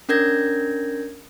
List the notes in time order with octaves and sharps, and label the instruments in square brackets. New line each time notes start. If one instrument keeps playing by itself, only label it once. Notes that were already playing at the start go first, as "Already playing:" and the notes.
[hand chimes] C#4 D4 A#4 G6 G#6 A#6